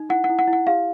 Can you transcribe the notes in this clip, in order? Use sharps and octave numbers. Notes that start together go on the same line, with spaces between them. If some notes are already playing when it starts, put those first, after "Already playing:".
Already playing: D#4
E4 F#5
F#5
E4
F#5
E4
F#5
G4 F5